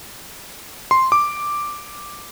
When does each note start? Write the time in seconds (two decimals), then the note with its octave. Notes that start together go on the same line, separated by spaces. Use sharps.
0.91 C6
1.12 D6